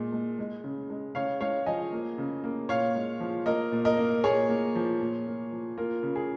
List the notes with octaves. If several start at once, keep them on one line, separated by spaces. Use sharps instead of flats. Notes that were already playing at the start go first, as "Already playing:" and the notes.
Already playing: A#2 G#3
G#3
G#3
C#3
G#3
C#3 C#5 F5
G#3 C#5 F5
F3 D#5 G#5
A#3
C#3
A#3
A#2 C#5 F5
G#3
F3
A#3 A#4 D#5
A#2
A#4 D#5
A#3
A#2 G#4 C#5
A#3
F3
A#2
A#3
F3
A#3 F4 A#4
C#3
G#4